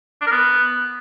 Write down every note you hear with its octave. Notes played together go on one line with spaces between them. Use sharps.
D4
A#4
B3